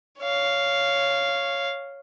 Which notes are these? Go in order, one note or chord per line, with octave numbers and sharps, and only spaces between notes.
C#5 F5